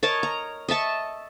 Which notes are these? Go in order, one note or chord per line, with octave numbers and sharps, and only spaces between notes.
A#4 C#5 D#5 A5
A#5
D#5 E5 A5 C#6